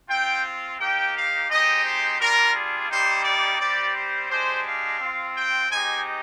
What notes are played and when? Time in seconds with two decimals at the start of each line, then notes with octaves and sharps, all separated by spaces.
0.09 C4 F4 G5
0.79 A#3 D#4 G4 G5
1.14 F5
1.49 G#3 C4 D#4 G4 D#5
1.83 C5
2.19 G3 D4 F4 A#4
2.54 G#4
2.89 G3 A#3 D#4 G4 C5
3.24 D5
3.59 G3 C4 G4 D5
3.94 C5
4.29 G#3 D4 G4 C5
4.64 F5
4.99 C4 F4
5.35 G5
5.69 G#3 C4 D#4 G4 G#5